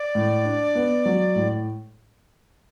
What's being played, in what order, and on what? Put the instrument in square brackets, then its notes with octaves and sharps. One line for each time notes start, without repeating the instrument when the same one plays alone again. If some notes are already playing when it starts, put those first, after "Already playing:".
Already playing: [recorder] D5
[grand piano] A2
D4
B3
F#3
A2